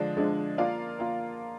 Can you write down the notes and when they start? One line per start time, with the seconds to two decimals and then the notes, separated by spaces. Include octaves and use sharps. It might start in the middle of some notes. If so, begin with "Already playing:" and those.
Already playing: D3 F3 G#3 D4
0.17 D3 F3 G#3 D4
0.58 A#3 F4 A#4 D5 F5
0.99 A#3 F4